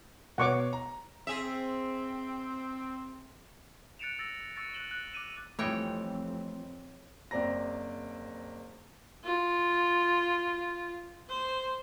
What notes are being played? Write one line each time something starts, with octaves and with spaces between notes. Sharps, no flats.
B2 C#5 F#5 C#6 D6
A#5
C4 G#4 E5
F#6 A6 C#7 D7 E7 F7
E6 A6 A#6
C#6 E6 A6 C#7
F#6 A6 E7 F#7 G7
F#6
D6 F#6 D#7 E7
F2 E3 G3 A3 C4 D#4 C#5 G5
F#1 C4 D5 A#5 A#6
F4
C5